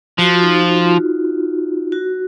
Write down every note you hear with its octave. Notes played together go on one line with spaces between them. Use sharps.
F3 F#4
F4
D#4
F4
F#4